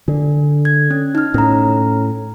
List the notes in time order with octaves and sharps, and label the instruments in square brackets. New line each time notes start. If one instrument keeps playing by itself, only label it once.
[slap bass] D3 [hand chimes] D4
[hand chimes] G#6
C#4
D#4 F6
[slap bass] A2 [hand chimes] C#4 A#5